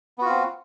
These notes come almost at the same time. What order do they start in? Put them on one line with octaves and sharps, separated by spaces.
B3 F#4 F4 C4